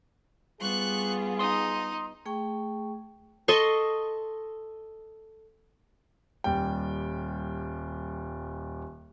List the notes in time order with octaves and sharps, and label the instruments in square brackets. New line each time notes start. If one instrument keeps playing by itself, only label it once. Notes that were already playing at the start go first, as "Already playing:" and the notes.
[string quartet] G3 B3 F4 [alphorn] G#4 [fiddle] C#6 F#6
[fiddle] D#4 [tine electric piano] C6 D#6
[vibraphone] A3 G#4 G5 C#6
[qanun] A4 D#5 C6 C#6
[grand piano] D#1 G3 G5